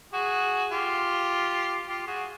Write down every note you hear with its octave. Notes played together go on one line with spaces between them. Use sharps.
F#4 G#4
F4 G4
F4 G4
F#4 G#4